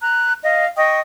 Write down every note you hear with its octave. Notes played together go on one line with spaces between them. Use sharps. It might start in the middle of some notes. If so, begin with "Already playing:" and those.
A#5 F#6
D#5 F5
D#5 G5 C#6 D#6